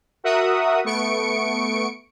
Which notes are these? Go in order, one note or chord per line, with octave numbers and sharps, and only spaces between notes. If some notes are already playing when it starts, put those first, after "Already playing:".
F#4 A#4 E5 F#5 D#6
A3 B3 C#6 C#7 D7